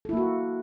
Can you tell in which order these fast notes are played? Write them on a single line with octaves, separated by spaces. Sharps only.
A4 E4 A#3 F#4